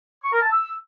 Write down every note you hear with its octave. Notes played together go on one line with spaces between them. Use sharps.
C#6
A#4
A5
E6